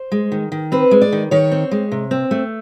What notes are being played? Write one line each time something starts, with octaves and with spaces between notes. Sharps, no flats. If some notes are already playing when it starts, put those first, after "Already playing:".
Already playing: C5
G#3
D#3
D#3
C4 B4
G#3
D5
D#3
D#3 C#5
C4
G#3
C3
C4
A3